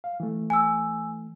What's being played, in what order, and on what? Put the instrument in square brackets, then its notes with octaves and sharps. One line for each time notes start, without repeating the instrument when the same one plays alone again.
[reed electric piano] F5
E3 A3
[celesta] G#5 E6